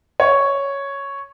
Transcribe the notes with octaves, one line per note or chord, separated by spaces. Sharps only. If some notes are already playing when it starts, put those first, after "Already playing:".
C#5